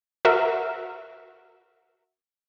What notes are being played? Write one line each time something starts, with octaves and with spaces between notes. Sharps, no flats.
F#4 A#4 E5